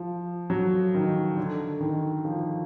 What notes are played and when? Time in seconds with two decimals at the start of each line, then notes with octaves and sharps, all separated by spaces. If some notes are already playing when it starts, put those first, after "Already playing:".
Already playing: F3
0.50 F#3
0.94 D#3
1.37 D3
1.80 D#3
2.25 F3